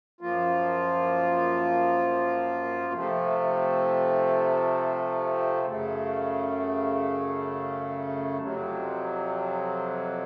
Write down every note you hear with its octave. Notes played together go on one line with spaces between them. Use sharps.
F#2 F3 A#3 F4
C3 F3 A3
F#2 C#3 A3
F2 C3 F#3